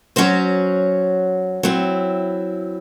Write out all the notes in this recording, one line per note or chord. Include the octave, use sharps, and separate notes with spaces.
F#3 C#4 F#4 C5
F#3 C4 E4